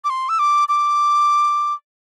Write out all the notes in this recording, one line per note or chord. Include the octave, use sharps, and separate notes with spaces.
D6
C6
E6
D6
D6